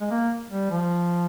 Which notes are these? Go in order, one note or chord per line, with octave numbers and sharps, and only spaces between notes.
G#3
A#3
G3
F3